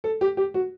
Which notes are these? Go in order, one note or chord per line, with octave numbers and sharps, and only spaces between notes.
A4
G4
G4
F#4